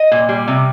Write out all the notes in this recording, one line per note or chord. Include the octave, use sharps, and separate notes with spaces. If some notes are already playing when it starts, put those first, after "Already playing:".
Already playing: D#5
A#2
G3
C3